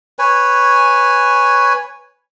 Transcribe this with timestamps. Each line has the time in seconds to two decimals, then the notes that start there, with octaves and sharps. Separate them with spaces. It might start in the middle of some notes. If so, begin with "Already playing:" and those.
0.19 B4 C#5 G#5